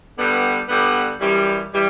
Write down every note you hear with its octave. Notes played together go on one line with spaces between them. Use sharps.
G2 D3 G3 B3
G2 D3 G3 B3
F#2 E3 G3
E3 G3